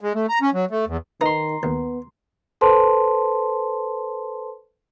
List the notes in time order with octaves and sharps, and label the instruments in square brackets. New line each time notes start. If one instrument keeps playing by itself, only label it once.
[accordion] G#3
A3
A#5
C#4
F#3
A3
E2
[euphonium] D#3 [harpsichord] D#4 B4 [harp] A#5 C6
[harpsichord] D#2 [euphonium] B3
[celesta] A4 B4 C5 A5 C6